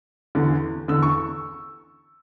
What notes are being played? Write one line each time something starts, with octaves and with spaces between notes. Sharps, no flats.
E2 D3
E2 D3 E6
C#6